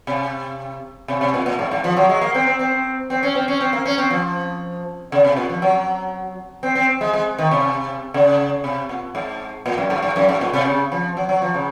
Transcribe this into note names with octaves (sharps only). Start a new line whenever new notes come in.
C3
C3
C3
A#2
A#2
G#2
G#2
F3
F#3
G#3
A#3
C4
C4
C4
C4
C#4
C4
C#4
C4
A#3
C#4
C4
F3
C#3
C3
A#2
F3
F#3
C4
C4
G#3
G#3
D#3
C3
C#3
C3
A#2
G#2
A#2
F#2
G#2
G#2
F#2
G#2
A#2
C3
C#3
F3
F#3
F#3
F3
C#3